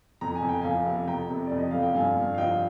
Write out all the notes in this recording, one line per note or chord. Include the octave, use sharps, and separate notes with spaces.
F2 A#5
G#5
F2
G5
F2 F5 G#5
C3
F2 G5 A#5
C3
F2 D5
D#5
F2 F5
G5
G2 F5 G#5
G2
F5
F3 D#5 G5